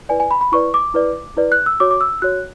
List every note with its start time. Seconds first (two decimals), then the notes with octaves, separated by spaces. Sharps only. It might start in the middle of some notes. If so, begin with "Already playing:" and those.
0.09 E4 B4 D5 G#5
0.20 G#5
0.31 B5
0.41 B5
0.52 E4 B4 D5 C#6
0.74 D6
0.94 E4 B4 D5
1.37 E4 B4 D5
1.52 F#6
1.66 E6
1.80 F#4 C#5 D6
1.91 D6
2.01 E6
2.22 F#4 C#5 F#6